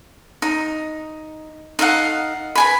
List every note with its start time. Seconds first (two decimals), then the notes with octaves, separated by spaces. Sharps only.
0.42 D#4
1.79 D#4 A4 F5 F#5
2.55 B4 G#5 B5